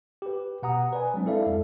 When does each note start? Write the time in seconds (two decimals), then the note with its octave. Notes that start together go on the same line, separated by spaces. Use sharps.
0.22 G4 B4
0.63 B2 F#5 A#5 D#6
0.93 B4 D5 G#5
1.14 F#3 G#3 C4 D4
1.26 E4 A4 D5 E5 F5
1.46 F2 G#3 A4